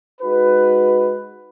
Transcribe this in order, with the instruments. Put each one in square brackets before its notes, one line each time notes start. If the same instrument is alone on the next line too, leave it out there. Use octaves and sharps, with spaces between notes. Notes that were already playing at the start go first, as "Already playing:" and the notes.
[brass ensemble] G#3 D#4 F#4 B4